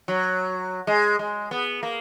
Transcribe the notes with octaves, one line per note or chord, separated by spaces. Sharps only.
F#3
G#3
G#3
B3
A#3